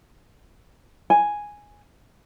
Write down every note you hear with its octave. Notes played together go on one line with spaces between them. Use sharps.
G#5